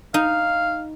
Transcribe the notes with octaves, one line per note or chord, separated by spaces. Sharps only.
D#4 F5